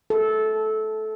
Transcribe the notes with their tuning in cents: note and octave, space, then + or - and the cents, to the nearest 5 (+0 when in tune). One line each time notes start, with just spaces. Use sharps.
A4 -15